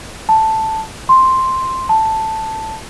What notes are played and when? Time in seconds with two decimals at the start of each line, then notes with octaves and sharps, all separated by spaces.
0.29 A5
1.09 C6
1.89 A5